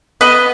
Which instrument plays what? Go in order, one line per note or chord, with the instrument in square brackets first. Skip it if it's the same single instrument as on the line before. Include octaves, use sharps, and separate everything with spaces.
[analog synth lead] B3 [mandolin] B4 D#5